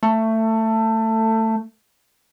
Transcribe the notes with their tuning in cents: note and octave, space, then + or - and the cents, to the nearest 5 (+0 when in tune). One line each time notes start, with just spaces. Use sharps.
A3 +20